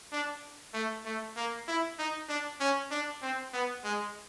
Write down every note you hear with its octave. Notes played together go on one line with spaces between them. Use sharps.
D4
A3
A3
A#3
E4
D#4
D4
C#4
D4
C4
B3
G#3